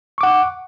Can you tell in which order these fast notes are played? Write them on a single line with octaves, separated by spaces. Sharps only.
C#6 D6 F#5